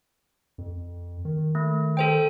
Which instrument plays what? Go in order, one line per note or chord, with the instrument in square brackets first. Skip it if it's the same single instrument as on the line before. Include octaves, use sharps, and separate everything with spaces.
[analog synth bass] F2
D#3
[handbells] A3
A4 C5 G5